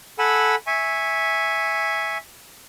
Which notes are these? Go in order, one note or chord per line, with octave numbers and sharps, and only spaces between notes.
A4 F#5 G#5 B5 E6
E5 G#5 C#6